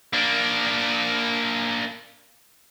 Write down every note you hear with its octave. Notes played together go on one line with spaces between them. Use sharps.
A#3 D4